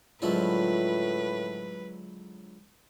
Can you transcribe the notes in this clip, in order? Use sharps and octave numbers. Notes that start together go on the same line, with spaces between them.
A2 D3 F3 F#3 G#3 E4 F4 B4